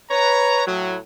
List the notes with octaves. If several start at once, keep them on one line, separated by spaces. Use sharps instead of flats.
B4 C#5 A#5
A2 F#3